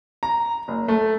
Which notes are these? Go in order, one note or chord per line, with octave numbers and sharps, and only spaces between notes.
A#5
F#1
A3